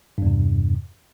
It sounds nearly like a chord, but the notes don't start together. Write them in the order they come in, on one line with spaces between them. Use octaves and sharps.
G2 E2 C3